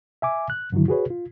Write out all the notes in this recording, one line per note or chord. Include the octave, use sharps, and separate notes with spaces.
E5 G#5 D6
F#6
G2 D3 D#3 F#3 E4
F#4 G#4 B4 C#5
F4